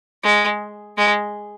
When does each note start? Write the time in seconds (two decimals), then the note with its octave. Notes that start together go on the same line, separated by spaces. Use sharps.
0.23 G#3
0.98 G#3